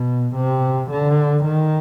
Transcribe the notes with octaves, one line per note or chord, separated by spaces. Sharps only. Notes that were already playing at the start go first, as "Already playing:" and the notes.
Already playing: B2
C3
D3
D#3